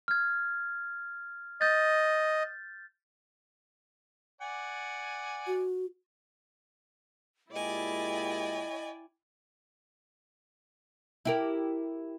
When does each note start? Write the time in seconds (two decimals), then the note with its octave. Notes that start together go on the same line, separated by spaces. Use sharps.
0.08 F6 G#6
1.61 D#5 G6 A6
4.41 D5 F#5 G#5
5.47 F#4
7.53 A#2 G#3 E4 G4 D5 D#5 G5 G#5
11.25 E4 G4 A#4